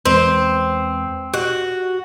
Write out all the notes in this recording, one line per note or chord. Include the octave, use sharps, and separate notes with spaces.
E2 G#3 C4 B4
F#4 G4